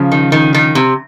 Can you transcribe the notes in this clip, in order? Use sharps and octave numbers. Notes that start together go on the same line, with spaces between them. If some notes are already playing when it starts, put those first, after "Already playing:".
Already playing: C#3 F3
D#3
D#3
D#3
C3